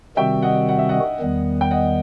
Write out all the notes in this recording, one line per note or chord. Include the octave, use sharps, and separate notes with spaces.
C3 D#3 G3 C4 F#4 E5 G5
D#5 F#5
F#5
E5
D#5 F#5
E2 D#3 G3 B3
G5
D#5 F#5